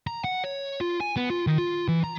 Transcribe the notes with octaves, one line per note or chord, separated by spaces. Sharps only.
A#5
F#5
C#5
F4
G#5
B3
F4
D#3
F4
E3
A#5